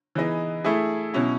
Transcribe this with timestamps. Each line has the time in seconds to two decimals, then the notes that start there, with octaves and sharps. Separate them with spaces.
0.15 E3 B3 D#4 G#4 D#5
0.64 A3 E4 G#4
1.14 B2 F#3 C#4 E4